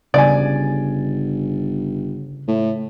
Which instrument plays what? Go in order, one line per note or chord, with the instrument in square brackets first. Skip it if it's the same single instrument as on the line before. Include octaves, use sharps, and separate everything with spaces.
[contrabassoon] G1 [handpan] C#3 [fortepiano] D5 G#5
[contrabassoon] A2